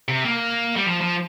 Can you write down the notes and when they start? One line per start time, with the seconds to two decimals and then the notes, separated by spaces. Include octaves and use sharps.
0.08 C3
0.25 A#3
0.76 G3
0.86 F3
1.01 F3